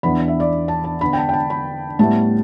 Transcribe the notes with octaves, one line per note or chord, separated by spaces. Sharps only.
E2 E3 B3 D4 B5
E5
D5
A5
A5
D3 B3 D4 B5
G5
A5
G5
A5
B5
A2 G3 B3 E4 A5